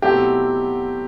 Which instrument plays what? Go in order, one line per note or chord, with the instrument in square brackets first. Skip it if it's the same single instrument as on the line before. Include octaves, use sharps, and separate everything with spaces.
[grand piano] B2 F#3 A3 C4 E4 G4